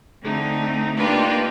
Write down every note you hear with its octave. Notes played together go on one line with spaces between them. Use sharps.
D3 A3 C4 D#4
A#3 D4 D#4 F4 G4 B4